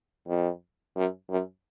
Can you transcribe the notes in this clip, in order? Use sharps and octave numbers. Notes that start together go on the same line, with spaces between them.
F2
F#2
F#2